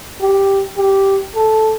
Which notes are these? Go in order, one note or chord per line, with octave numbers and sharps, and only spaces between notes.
G4
G4
A4